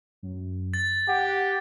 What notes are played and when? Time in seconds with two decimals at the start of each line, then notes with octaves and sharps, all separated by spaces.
0.23 F#2
0.74 A6
1.08 G4 F#5